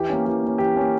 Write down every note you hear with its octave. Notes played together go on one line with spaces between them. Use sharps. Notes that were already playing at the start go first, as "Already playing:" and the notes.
Already playing: E3 G4
A#3 C#4
E3 G4
A#3 C#4
E3 G4
A#3 C#4